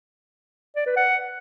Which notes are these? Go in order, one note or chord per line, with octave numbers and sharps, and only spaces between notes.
D5
B4
F#5